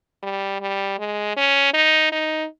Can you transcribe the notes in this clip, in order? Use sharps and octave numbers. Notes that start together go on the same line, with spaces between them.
G3
G3
G#3
C#4
D#4
D#4